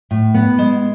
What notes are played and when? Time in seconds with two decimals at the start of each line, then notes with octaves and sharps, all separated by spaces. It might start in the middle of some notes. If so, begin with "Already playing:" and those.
0.11 A2
0.34 B3
0.58 G#3